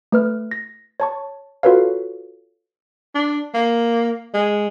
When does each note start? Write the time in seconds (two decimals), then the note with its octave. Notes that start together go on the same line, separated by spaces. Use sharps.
0.12 A3 B4 F6
0.51 A#6
1.00 C#5 A5 C#6
1.63 F4 F#4 A4 B4 C#5 F5
3.15 D4
3.54 A#3
4.34 G#3